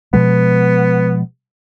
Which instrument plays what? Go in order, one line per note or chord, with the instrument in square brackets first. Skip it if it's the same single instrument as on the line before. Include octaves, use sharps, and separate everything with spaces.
[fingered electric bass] B2 F3 G#3 [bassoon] B3